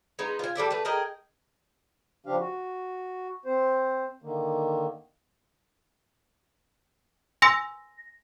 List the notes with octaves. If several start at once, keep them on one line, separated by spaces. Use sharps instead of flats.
G#3 B3 D#4
F4 G#5
G3 A4 D5 E5
A3 B4
G#4 A#4 D#5 G5
C#3 F3 D4 G4 F5
F#4
C4 C5
D3 D#3 A#3
G#5 C6 E6 A#6